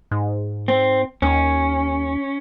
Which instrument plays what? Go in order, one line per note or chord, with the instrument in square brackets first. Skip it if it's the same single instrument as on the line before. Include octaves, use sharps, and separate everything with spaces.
[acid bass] G#2
[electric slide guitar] C4
[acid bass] D#2 [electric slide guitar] C#4